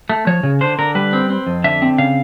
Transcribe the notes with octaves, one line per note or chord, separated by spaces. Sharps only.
A3
F3 C#5
C#3
D3 C5
D3 A#4
G3 B4
C4
C4
F2
D3 E5
C4
C#3 F5